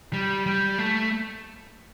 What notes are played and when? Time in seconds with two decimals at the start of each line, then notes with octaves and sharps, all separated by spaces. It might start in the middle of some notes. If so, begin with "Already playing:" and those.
0.13 G3
0.46 G3
0.78 A3